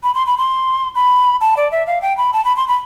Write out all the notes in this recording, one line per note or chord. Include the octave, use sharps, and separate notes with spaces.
B5
C6
B5
C6
B5
A5
D5
E5
F5
G5
B5
A5
B5
C6
B5